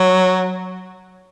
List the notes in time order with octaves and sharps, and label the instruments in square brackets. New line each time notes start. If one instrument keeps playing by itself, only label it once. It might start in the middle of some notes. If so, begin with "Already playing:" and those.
Already playing: [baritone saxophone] F#3